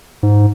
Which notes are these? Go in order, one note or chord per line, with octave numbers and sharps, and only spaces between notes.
G#2